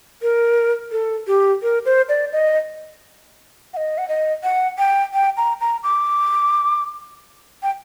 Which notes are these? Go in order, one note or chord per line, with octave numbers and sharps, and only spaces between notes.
A#4
A4
G4
A#4
C5
D5
D#5
F#5
D#5
F#5
D#5
F#5
G5
G5
A#5
A#5
D6
G5